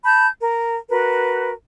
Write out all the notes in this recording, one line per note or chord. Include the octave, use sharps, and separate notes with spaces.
A5 B5 G6
A#4
F#4 A#4 B4